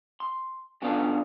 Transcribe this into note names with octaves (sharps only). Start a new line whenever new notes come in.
C6
C#3 F#3 B3 D4 F4 A4